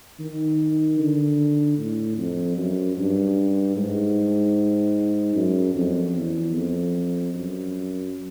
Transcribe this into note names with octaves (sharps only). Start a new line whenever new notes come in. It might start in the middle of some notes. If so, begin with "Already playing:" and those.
D#3
D3
A2
F2
F#2
G2
G#2
F#2
F2
E2
F2
F#2